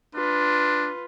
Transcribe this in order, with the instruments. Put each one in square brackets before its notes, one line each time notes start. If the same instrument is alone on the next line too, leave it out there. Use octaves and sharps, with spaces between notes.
[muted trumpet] D4 [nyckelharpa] F4 B4